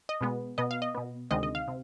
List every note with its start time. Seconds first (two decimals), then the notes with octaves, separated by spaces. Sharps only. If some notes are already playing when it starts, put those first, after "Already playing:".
0.09 D#5
0.21 B2 G#3 B3
0.58 B2 B3 D#5
0.71 F5
0.82 D#5
0.95 B2 B3
1.31 D2 C3 D#3 G#3 D#5
1.43 D#5
1.55 F5
1.68 C3